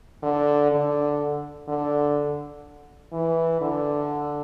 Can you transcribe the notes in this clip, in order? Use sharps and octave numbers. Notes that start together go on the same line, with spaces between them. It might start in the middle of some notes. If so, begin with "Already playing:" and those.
D3
D3
D3
E3
D3